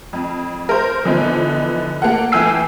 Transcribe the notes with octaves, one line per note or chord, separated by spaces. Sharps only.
F2
A#4 C5
D3 E3 F3 B3 D#4
A#3 A4 F#5
E3 A3 G5 G#5 E6 C7